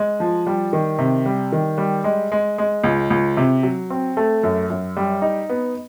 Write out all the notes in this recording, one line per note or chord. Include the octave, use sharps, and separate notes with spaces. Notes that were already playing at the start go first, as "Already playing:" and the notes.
Already playing: G#3
F3
G3
D#3
C3
G3
D#3
G3
G#3
G#3
G#3
C#2
C#2
C3
F#3
C4
A3
F#2
F#2
G3
D#4
B3